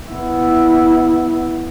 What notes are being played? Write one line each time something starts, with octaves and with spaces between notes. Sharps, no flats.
B3 E4